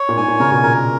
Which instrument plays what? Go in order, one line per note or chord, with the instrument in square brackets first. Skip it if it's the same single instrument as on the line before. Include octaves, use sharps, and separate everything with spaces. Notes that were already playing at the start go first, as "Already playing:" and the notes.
Already playing: [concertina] C#5
[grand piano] A#2
[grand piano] G#2 [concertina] G#5
[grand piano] A#2
[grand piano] C#3 [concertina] A#4
[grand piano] B2
[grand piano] A#2 [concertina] A#4